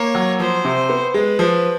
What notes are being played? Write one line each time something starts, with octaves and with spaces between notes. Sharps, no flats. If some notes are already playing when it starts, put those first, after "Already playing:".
Already playing: A#3 C#5
F#3
F3 C5
C3
B3
G#3 B4
F3